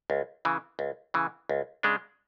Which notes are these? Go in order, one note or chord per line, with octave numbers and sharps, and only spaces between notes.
C#2
C#3 E3
C#2
C#3 E3
C#2
C#3 G#3 D4